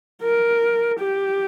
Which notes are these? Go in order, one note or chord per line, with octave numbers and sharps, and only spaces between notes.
A#4
G4